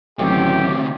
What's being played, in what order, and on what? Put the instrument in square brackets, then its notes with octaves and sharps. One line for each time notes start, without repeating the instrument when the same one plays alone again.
[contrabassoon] A1 [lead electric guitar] D2 C3 [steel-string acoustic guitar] D#3 F#3 C#5 [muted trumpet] G4